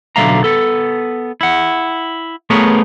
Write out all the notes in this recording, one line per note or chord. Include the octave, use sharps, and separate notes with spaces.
B1 D3 F#3 E5 F5 A#5
B3 A4
E4 F#5
A3 B3 G#4 A#4 B4 C#5